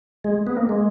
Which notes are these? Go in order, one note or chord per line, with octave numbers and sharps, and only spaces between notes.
G#3
B3
A#3
G#3